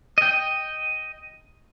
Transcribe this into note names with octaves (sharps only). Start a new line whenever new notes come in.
D#5 G5